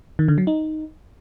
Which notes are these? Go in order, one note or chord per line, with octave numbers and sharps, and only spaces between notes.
D#3
D3
F#3
D#4